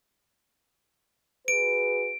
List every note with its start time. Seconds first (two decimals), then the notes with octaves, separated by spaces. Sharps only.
1.48 F#4 G#4 B4 D7